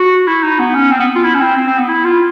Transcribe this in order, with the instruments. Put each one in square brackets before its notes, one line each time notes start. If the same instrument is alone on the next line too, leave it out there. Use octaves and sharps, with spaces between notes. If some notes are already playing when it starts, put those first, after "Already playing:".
Already playing: [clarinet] F#4
E4
D#4
B3
C#4
C4
B3
F4
E4
C#4
C4
C4
C4
B3
E4
F4